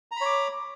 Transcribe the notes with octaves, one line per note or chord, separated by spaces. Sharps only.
C#5 A#5 B5 D6